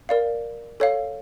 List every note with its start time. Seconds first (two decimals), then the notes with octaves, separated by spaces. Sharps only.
0.09 A#4 D5 F5
0.80 A4 C#5 F5